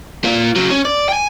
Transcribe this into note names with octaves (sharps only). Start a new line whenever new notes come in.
A#3 F4
C#3 F#3
C#4
D5
G5 G#5